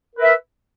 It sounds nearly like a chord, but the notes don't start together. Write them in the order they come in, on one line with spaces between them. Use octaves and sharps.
A#4 B4 E5